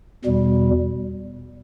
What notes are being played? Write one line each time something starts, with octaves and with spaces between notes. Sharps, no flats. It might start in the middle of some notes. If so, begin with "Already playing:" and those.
E2 B2 G3